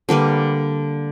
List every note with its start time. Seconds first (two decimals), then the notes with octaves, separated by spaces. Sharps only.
0.09 D3 G3 A#3 B4